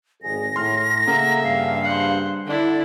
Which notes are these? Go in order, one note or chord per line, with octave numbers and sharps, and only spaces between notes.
G#1 F2 G#4 A#6
A2 C6 F6
C#3 A#3 A4 E5 F#5 A#5
G2 F5
C5 F#5
D3 D4 E4 D5